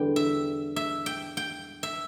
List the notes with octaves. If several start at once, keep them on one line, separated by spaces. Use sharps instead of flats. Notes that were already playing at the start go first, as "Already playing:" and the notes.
Already playing: E2 D3 G3 G5
E5
E5
G5
G5
E5